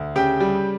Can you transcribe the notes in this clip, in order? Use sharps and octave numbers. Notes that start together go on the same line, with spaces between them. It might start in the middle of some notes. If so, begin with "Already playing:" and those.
Already playing: D2
C#3 G4 G5
G3